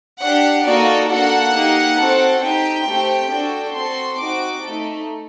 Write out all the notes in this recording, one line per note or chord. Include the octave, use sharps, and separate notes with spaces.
D4 G4 F#5
A#3 D#4 F#4 A4 D5
A#3 D4 F#4 A4 F#5
A#3 D#4 G4
C4 F#4 A4
C4 D#4 G4 G5
A3 C4 G4
D4 F#4 A4
C4 F#4 A4 C6
C4 D#4 F#4 D6
A3 D#4 A4